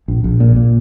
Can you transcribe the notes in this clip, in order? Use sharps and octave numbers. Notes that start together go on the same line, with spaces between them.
A#1
A#1
A#2
A#2